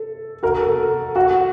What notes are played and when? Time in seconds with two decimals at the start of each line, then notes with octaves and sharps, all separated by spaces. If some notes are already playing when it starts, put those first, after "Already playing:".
Already playing: A4
0.43 F#4 A#4
0.61 A4
1.16 F#4